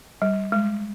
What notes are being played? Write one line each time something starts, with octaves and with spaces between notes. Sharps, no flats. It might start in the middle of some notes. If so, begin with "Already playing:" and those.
G3
G#3